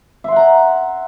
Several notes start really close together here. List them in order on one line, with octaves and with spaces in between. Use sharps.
E5 C6 F#5 A#5